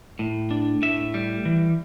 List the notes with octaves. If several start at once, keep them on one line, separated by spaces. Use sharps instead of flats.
A2
D4
A2 E5
G3
E3